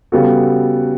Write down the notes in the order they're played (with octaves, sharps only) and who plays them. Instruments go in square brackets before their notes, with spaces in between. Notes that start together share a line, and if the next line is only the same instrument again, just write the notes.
[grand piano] C#3 G3 B3 F#4 A4